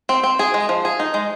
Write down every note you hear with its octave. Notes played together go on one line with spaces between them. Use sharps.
C4
C4
G#4
G#3
F3
G#4
D#4
G#3